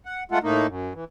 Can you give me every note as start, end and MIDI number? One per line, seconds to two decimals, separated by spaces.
0.06 0.24 78
0.31 0.39 56
0.31 0.39 57
0.31 0.39 65
0.31 0.39 69
0.31 0.39 78
0.43 0.67 45
0.43 0.67 57
0.43 0.67 58
0.43 0.67 63
0.67 0.93 42
0.94 1.04 52